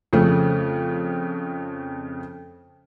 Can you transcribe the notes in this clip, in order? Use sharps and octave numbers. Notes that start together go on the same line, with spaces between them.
F2 C#3 A3